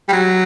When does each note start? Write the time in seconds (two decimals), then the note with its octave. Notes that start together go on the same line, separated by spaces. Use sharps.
0.08 G3
0.12 F#3